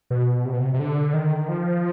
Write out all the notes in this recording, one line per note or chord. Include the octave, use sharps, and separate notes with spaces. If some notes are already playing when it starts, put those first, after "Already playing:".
B2
C3
B2
C3
C3
D3
D#3
F3